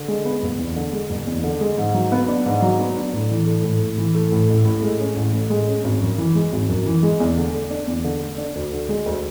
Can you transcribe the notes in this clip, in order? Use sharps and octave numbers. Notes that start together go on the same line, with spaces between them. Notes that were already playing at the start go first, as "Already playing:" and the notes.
Already playing: D3
G#3
B3
F#1
E2
D3
G#3
F#1
E2
D3
G#3
G#2
F#3
B3
D4
G#2
F#3
B3
D4
A2
E3
A3
A2
A2
E3
A3
A2
A1
A2
G#3
C#4
A1
A2
G#3
C#4
G#1
F#2
E3
G#3
G#1
F#2
E3
G#3
E2
D3
A3
D4
E2
D3
A3
D4
D2
D3
G#3
D2